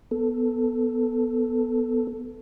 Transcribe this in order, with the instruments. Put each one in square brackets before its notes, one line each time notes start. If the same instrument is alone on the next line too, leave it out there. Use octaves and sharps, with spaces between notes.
[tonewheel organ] B3 A4